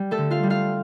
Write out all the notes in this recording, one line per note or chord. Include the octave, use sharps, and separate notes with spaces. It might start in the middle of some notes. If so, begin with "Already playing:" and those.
Already playing: G3
A3 A4
D3
F4 F5
G3
F4 F5